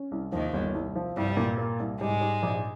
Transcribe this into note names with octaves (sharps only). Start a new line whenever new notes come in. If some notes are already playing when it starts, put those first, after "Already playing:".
Already playing: C#4
C2
D#2 D#3 F3
G1
C2
F3
C2 G2 G3
A#2
A#3
C2
G#2 G3 G#3
G3
A#1